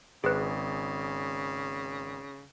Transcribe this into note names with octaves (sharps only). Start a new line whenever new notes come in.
G#1 C#3 G#4 B4